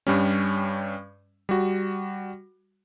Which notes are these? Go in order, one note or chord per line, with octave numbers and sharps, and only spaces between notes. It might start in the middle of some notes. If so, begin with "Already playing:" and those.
G2 G3 C#4
G3 F#4